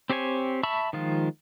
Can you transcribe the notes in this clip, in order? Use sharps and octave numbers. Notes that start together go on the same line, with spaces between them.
C4 G4 C5 C#5 G#5
E5 A5 B5 C#6 E6
D#3 F3 G#3 F4